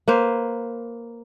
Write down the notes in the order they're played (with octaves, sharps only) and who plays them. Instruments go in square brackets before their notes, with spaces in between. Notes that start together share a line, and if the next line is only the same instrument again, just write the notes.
[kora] A#3 B4 C5